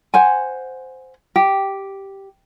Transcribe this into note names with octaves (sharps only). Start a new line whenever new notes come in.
C5 F#5 G#5
G4